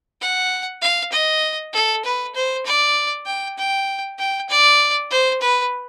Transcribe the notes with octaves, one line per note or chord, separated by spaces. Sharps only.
F#5
F5
D#5
A4
B4
C5
D5
G5
G5
G5
D5
C5
B4